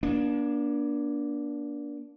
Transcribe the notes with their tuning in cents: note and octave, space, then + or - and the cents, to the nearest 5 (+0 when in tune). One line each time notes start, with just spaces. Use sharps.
A#3 +40 D4 -15